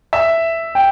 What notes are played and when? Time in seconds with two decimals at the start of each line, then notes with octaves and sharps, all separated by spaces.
0.13 E5
0.75 G5